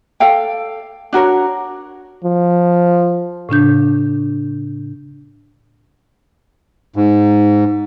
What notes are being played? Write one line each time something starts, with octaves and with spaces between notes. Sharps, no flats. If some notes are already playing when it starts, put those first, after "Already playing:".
A4 D5 F5 G5
D4 F#4 A#4 C#5
F3
A2 C#3 D4 G6
G#2